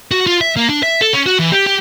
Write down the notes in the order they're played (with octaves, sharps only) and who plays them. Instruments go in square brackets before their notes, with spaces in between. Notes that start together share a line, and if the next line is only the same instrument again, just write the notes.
[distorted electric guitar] F#4
F4
E5
A#3
D4
E5
A4
C#4
F#4
E3
G4
G4